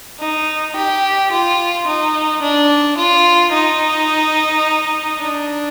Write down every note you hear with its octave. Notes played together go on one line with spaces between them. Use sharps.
D#4
G4
F4
D#4
D4
F4
D#4
D4